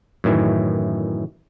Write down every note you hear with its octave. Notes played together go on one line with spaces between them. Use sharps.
F#2 A2 D#3 E3